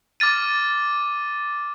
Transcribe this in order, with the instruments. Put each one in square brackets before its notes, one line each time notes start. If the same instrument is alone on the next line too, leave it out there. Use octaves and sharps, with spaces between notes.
[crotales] D6 F6 A6 D#7